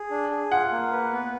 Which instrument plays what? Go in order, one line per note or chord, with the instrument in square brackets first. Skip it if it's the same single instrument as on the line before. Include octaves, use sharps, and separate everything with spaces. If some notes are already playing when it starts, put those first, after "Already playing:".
Already playing: [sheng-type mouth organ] G#4
D4
G#4
[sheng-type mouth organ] F4 [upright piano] F#5
[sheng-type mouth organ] A#3
B4
B3